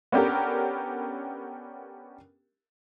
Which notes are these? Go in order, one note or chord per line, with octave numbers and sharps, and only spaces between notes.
B3 C#4 D4 G4 A4 A#4